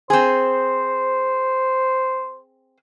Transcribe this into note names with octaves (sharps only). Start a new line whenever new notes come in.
C4 G#4 C5